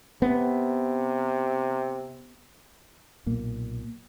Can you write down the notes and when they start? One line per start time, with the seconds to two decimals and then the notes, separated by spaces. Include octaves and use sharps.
0.22 C3 B3
3.26 B1 A#2 A#3